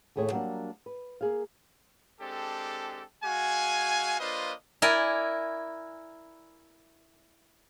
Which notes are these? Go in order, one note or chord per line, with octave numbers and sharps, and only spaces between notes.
D#2 A2 A3 G#4 C#5
F#3 G3 A#3 C#4 D4
B4
A#3 G#4 F5
G#3 C4 D4 G4 A4
G#3 F#4 F5 G#5
A#3 D4 F4 B4 C5 D#5
E4 A#4 D5 G#5